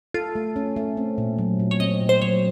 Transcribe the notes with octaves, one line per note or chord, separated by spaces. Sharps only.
F4 A4
A3
C#4
A3
C4
A#2
F#3
A#2
C#5
C4 D#5
A#2
C5
F#3 C#5